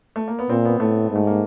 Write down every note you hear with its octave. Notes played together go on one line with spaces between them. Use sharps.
A3
A#3
B3
A#2 C4
B3
A2 A3
G#2
A3
A#3